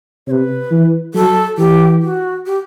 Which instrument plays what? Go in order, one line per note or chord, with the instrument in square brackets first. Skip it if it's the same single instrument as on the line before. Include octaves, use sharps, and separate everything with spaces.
[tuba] C3 [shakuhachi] B4 C#5
[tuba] E3
[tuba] F#3 [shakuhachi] A4
[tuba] E3 [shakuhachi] G4
[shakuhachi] F#4
G4